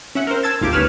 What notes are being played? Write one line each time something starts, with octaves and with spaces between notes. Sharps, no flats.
C#4 E5 F#5
A#4 C5
A5 E6 G#6 A6 E7
G#1 D#2 F4 G4 D6
D#2 C#3 B4 C#5 F6 E7